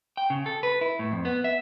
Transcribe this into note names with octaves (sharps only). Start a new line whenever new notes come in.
G5
C#3
A4
B4
E4
A2
F2
B3
E5